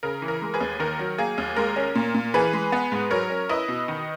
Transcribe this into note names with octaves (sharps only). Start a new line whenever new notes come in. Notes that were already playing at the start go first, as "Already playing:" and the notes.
C#3 A#4
E3
A#4
G#3
G#4 B4
D#2
D#3 A#4
F#3
A#3 G#4
D#2
G#3 A#4
C#4
A#2
A#2
E3 G#4 B4
G#3
B3
G#2
F#3 A#4 C#5
C#4
E4 B4 D#5
B2
D#3